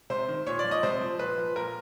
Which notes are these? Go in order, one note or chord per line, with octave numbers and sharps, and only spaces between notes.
C3 C5
D#3
A#2 C#5
D5
F3
D#5
C3 C5
F3
A#2 B4
F3
A#2 A#4